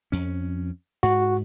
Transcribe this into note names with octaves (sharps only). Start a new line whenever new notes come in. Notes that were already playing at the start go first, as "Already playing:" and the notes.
F2 C#4
G#2 F#4